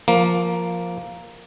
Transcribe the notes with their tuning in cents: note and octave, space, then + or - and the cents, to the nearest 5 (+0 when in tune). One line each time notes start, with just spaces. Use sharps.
F3 +0 A#3 +0